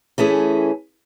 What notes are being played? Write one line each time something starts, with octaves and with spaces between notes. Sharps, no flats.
E3 A3 C#4 G#4